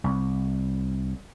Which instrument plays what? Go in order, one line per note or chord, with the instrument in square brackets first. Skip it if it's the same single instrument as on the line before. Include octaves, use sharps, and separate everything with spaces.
[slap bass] C2